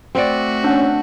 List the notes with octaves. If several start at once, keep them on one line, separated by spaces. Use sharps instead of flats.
A3 C4 F#4 D5
C#4 D4 F#5